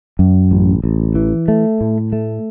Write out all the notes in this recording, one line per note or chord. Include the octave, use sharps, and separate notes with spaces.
F#2
A1
A1
E3
A3
A2
A3